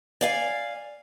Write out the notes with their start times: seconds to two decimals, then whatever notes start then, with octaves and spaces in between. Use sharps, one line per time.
0.21 D5 F5 G#5